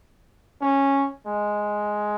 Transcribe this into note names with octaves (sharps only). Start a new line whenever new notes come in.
C#4
G#3